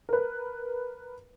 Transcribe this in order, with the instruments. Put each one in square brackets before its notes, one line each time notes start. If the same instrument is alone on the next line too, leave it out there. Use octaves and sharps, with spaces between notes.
[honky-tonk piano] A#4 B4